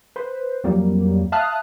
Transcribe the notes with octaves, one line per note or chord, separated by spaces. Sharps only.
B4 C5
F2 F#3 G3 A#3
E5 F5 A5 D#6 F6 F#6